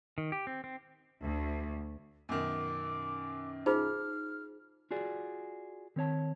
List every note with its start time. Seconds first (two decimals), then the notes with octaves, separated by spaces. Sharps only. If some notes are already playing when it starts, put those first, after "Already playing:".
0.18 D#3
0.32 G4
0.47 C4
0.64 C4
1.23 D2
2.29 F#2 B2 D#3 D6
3.66 D#4 F4 G#4 C5 F6
4.91 F4 F#4 G#4 D5
5.96 D#3 C4 C#5 A5